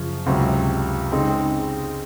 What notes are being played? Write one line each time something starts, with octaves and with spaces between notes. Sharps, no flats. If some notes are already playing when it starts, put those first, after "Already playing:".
Already playing: F#2 C#3 F3
C#2 C3 F#3
C#3 G#3 C4 D#4